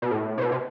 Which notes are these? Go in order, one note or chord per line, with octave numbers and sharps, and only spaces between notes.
B2
A2
C3
B2
C3